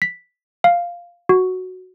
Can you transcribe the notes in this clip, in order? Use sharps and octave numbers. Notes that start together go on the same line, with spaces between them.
B6
F5
F#4